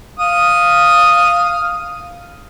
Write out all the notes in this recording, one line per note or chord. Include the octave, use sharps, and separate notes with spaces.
F5 D#6